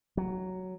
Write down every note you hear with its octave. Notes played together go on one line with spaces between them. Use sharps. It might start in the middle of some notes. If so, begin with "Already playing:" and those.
F#3